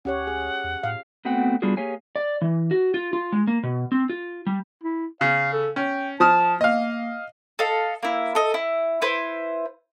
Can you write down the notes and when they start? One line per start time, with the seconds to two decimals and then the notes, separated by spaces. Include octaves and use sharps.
0.05 D2 C#4 G4 C#5 F#5
0.27 G#4
0.64 E2
0.83 A2 F5
1.25 A3 B3 C4 F#4 F#5 G5
1.62 G3 B3 D4 F4 F#4 G#4
1.77 A#3 G4 G#4 C#5 F5 G#5
2.16 D5
2.41 E3
2.71 F#4
2.94 F4
3.13 F4
3.32 G#3
3.47 A#3
3.63 B2
3.92 C4
4.09 F4
4.47 G3
4.84 E4
5.21 C#3 F5
5.53 A4
5.76 C#4 G5
6.20 F3 A5 D#6 F6
6.61 A#3 D#5 F5
7.59 A4 D#5 F5
8.03 A#3 E4
8.35 A4 D#5
8.54 E4
9.02 E4 B4 C5